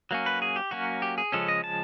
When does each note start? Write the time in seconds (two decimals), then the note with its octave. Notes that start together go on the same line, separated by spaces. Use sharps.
0.11 F#3 A#3 C#4
0.26 B4
0.42 G#4
0.56 G4
0.71 F#3 A#3 C#4 F#4
1.02 G4
1.18 G#4
1.32 C#3 F3 G#3 C#4 A4
1.48 D#5
1.64 A5